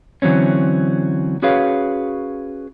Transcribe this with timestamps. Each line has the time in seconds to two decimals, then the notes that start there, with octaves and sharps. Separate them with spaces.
0.22 D3 E3 F#3 C4 C#4
1.42 C#4 F#4 G#4 B4 C#5 F5